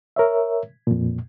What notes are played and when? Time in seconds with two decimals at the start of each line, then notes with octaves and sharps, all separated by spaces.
0.16 A#4 C#5 E5
0.87 F2 A#2